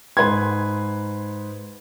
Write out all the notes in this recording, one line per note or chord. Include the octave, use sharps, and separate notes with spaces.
G#2 B4 C6 G#6